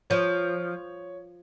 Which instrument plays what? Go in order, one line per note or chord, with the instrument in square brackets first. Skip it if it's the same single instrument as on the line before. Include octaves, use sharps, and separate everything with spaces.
[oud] F3 [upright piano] C#5